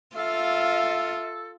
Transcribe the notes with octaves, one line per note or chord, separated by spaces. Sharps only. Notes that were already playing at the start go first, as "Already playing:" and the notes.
F4 A4 E5 F5